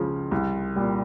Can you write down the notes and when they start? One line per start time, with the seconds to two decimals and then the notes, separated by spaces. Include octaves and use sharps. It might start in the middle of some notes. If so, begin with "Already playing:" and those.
Already playing: C#2 C#3 F3
0.31 C2
0.76 A#2 G3